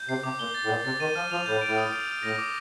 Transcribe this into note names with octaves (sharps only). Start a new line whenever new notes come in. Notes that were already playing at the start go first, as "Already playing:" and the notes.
Already playing: G6
C3 C7
C3 D6
A#2 G7
A6
A2
A#2 G7
C3 A6
D#3 D#7
F3 F6
F3 F7
A2 G6
D7
A2
D#6
D7
F6
A2 A#6
D6